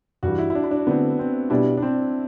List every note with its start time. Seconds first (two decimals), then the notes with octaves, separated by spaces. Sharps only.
0.23 G2 E3 G3 F#4
0.38 E4
0.50 E4
0.55 D4
0.64 E4
0.71 D4
0.87 D3 A3 B3 C4 E4
1.19 C4
1.50 B2 G3 B3 D4 E4
1.77 D4
1.82 C4